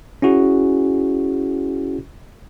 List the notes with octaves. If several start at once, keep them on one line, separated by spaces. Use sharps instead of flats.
C#4 E4 F#4 G#4